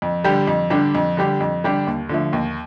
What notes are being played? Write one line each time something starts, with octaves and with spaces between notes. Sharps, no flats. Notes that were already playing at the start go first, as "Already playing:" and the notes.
F2
D3 G3 D4 G4
F2
D3 G3 D4 G4
F2
D3 G3 D4 G4
F2
D3 G3 D4 G4
D#2
D3 F3 A3
D#2